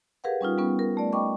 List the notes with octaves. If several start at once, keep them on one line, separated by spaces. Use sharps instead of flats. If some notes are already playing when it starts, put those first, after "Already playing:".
G4 G#4 A#4 B4 F5 F#5
G3 C#4 D#4 F4
G3 B3 C#4
A#4
A3 D5
D#5 G5 B5 C#6 D6